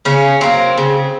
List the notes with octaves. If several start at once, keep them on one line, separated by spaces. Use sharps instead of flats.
C#3 C#4
F#3 A#3 C4
C#3